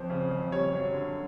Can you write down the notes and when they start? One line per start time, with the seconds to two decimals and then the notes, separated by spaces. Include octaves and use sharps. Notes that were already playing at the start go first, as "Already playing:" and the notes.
Already playing: F2 C5
0.10 C#3
0.31 F2
0.52 G3 C#5
0.73 F#2
0.94 D3